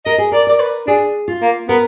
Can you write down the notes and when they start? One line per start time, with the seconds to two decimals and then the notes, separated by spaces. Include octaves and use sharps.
0.05 A#4 D#5
0.18 G#4
0.32 A#4 D5
0.47 A#4 D5
0.60 B4
0.87 D4 G#4
1.28 F4
1.42 A#3
1.69 B3 A#4